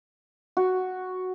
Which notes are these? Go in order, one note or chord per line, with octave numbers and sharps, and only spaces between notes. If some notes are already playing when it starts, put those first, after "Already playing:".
F#4